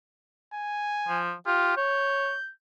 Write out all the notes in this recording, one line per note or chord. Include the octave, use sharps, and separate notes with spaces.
G#5
F3
F4 G4
C#5 G6